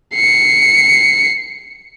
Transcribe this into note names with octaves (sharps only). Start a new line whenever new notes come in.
C7 C#7